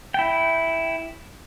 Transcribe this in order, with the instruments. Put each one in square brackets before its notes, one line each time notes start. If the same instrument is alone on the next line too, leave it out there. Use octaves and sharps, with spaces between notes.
[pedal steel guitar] E4 G5